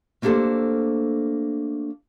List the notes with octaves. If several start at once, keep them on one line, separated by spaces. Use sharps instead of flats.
A3 A#3 D4 G4 A4 C5